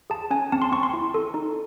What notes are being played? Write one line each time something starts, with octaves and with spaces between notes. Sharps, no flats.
G#4 A5
C#4 G#5
C4 A5
C6
C4 C#6
C6
E4
A4
D#4